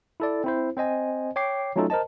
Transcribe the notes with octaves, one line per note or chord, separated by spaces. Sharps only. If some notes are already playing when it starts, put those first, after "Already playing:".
E4 A4 D5
C4 E4 C5
C4 C5 D#5 G#5
C#5 G5 D6 C7
F#3 A3 C#4 D#4 F4 A4
A#4 C5 D#5 A5